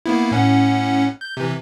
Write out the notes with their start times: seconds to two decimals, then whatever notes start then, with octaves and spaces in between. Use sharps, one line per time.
0.06 A#3 B3 E4
0.31 A2 C#4 F#5
1.21 G6
1.37 C3 E3